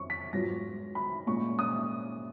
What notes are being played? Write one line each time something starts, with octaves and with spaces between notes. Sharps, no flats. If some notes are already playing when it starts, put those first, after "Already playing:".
Already playing: F2 F3 C#6
B6
G#2 F#3 B3 F4 A#6
B5
A#2 G#3 C#4 C#6
D#6